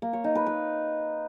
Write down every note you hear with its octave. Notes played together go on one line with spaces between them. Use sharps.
A#3
C#5
D#4
B4
B4